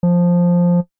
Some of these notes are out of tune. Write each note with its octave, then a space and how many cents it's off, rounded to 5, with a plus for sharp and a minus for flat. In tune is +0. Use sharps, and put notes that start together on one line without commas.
F3 +5